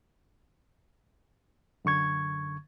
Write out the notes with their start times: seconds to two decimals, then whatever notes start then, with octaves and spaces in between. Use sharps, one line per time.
1.85 F#2 D3 C#6 G#6